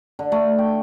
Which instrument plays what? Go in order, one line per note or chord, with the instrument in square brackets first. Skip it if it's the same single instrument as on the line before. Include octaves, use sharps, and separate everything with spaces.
[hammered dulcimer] D3
A3
G5